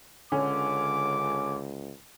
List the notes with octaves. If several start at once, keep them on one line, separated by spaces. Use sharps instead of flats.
C#2 D3 C#4 D6